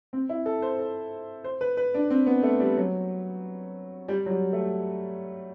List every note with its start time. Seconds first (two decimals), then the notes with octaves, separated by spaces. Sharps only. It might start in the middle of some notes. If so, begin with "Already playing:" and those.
0.13 C4
0.29 E4
0.46 A4
0.62 C5
0.79 A4
1.44 C5
1.61 B4
1.77 B4
1.94 D4
2.10 C4
2.27 B3
2.43 A3
2.60 G3
2.77 F#3
4.08 G3
4.26 F#3
4.30 G3
4.53 A3